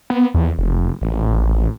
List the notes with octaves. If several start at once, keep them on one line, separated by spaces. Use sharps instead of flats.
B3
E2
F1
A1